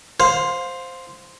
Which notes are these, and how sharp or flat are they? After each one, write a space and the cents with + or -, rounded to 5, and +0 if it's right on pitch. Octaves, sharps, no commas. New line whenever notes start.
C5 +0 F5 +25